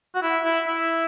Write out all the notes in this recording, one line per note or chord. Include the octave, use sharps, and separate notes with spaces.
F#4
E4
E4
E4